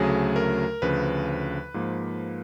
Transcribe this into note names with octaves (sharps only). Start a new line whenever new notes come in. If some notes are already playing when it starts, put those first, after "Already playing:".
Already playing: D2 C#3 F#3 A3 G#4
A#4
D2 C#3 F3 B4
G#2 F3 A#3